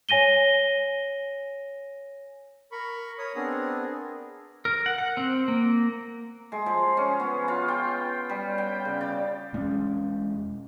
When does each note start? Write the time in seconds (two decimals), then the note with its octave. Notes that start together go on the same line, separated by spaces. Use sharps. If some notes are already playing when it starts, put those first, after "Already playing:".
0.09 C#5 G#5 A#6 D#7 G7
2.72 A#4 B5 C#6
3.19 A#4 C#5 D#6
3.36 B3 C4 D4 G#4 A#4
4.65 A#4
4.86 F#5
4.98 F#5
5.17 C4
5.48 A#3
6.52 G#3
6.66 F3
6.97 C#4
7.20 B3
7.48 F4
7.68 G5
8.29 G3
8.58 G5
8.85 C#3
9.01 D5
9.53 E1 G#3 C#4